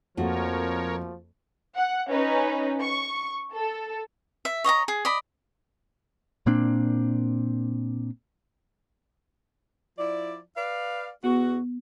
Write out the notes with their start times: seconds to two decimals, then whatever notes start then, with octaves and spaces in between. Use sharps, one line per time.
0.17 F2 F3 A3 A#3 F#4 A#4 C#5
1.76 F#5
2.10 C#4 D#4 B4
2.81 C#6
3.54 A4
4.45 E5
4.64 C#5 D#5 F5 A#5
4.88 G#4
5.05 D5 D#5 B5
6.46 A#2 A#3 C4 D4
9.98 F3 E4 D5
10.56 B4 D5 F5
11.24 E2 B3 F#4